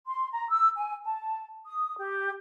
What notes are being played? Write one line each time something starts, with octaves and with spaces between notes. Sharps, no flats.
C6
A#5
E6
G#5
A5
D#6
G4